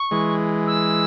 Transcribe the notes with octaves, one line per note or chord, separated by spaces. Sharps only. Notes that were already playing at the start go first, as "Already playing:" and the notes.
Already playing: C#6
E3 G#3
E6